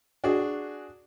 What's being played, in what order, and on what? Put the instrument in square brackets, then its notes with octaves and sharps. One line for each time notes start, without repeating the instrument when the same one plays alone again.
[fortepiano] D4 F#4 G#4